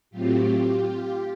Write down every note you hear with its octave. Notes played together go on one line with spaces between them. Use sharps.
A2 F#3 A3 C4 F4 G4